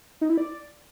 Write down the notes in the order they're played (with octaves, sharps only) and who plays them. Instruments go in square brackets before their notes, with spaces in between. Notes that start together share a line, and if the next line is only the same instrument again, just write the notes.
[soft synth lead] D#4
E4
D5